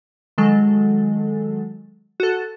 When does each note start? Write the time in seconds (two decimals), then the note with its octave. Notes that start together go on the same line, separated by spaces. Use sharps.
0.38 D#3 F#3 G#3 A4
2.20 F#4 A4